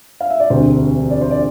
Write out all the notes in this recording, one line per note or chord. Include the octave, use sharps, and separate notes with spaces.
F5
E5
D5
E1 D2 C3 C5
D5
C5
D5